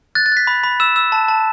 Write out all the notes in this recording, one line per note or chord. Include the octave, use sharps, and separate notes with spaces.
F#6 A6
A6
F#6 B6
B5
B5
E6 E7
E6
A5
A5